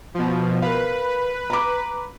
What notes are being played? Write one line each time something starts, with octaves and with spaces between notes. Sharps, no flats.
B2 F3
A#4 B4 F5
A#5 B5 D6